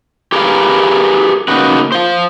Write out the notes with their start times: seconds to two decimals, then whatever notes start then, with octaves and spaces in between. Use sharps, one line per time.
0.32 G4 G#4 A#4 B4 E5 F5
1.48 C#3 A#3 D#4 F#4 B4
1.92 C5 F5